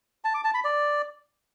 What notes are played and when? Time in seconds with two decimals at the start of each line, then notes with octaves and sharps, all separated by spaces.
0.24 A5
0.34 D6
0.44 A5
0.54 B5
0.64 D5